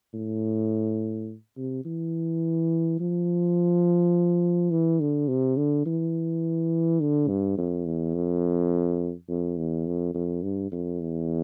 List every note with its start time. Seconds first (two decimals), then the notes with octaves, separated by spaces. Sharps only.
0.14 A2
1.57 C3
1.85 E3
3.00 F3
4.71 E3
5.00 D3
5.28 C3
5.57 D3
5.86 E3
7.01 D3
7.28 G2
7.58 F2
7.86 E2
8.15 F2
9.29 F2
9.58 E2
9.87 F2
10.14 F2
10.43 G2
10.72 F2
11.01 E2